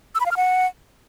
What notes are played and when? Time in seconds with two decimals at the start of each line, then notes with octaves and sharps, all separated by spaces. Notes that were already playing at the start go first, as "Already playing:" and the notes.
0.15 E6
0.20 B5
0.26 F5
0.31 F6
0.37 F#5